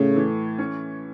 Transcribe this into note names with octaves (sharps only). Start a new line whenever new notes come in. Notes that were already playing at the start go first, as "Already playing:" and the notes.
Already playing: A2 C#3 A3
E3
C#4